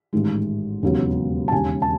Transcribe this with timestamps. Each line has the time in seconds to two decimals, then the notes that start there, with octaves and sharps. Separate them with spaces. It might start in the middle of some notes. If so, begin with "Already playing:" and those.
0.13 A1 G#2 D#3 G#3
0.83 E1 D#2 C#3 F#3 B3
1.48 A5
1.52 E1 D#2 C#3 G#5
1.82 A5